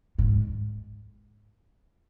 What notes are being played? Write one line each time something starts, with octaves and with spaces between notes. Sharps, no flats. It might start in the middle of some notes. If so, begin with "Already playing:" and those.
G#2